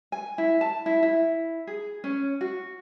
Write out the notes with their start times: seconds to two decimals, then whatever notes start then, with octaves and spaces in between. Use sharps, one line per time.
0.12 G#5
0.38 E4
0.61 A5
0.86 E4
1.03 E4
1.67 G#4
2.04 C#4
2.41 F#4